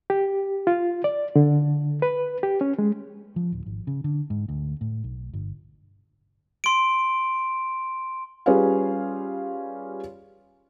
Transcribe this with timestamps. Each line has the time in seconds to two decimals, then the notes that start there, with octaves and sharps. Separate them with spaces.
0.10 G4
0.67 F4
1.04 D5
1.36 D3
2.02 B4
2.43 G4
2.61 C#4
2.78 G#3
3.36 F3
3.52 D1
3.66 G#1
3.87 C#3
4.04 D3
4.30 G#2
4.49 D2
4.81 A2
5.04 B1
5.34 G1
6.64 C6 D7
8.46 G3 C#4 F4 G#4 B4 F5